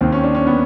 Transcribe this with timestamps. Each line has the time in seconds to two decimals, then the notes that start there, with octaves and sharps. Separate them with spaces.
0.01 D#2 D#3 C4
0.12 C#4
0.23 D4
0.35 C#4
0.47 B3